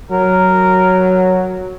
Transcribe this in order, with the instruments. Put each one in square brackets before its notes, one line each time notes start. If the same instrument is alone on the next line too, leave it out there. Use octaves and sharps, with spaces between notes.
[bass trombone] F#3 [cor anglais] A#4